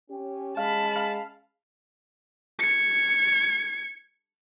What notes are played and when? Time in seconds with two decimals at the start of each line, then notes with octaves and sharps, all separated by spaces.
0.11 C#4 G4
0.57 G#3 F5 A5 B5
0.96 F5
2.60 G#6 C#7